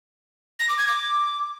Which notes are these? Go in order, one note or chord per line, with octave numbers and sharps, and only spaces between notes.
A#6
D6
G#6
D6